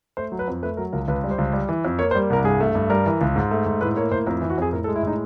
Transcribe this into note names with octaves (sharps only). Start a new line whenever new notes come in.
A3 C5
F#3
B4
F2
A3 B4
F#3 A#4
C#2 A#4
C#2 B4
G3
C5
C#2
G3
E3
F2
A#3 C#5
C5
G3
C2 A#4
G2 G#4
A3
G2
G3 A#4
E3
C#2
G#2
A3
G#2
A2 B4
A#3 C#5
A2 C5
F2 A#4
E3
F#4
F2 G#4
A2 A#4
A4
G#3
E4
A2 D#4